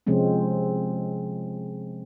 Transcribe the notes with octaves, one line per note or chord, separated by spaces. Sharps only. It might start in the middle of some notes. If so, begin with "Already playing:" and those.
C3 F3 G#3 C4 C#4